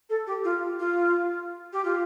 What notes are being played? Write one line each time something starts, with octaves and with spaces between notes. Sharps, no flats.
A4
G4
F4
F4
G4
F4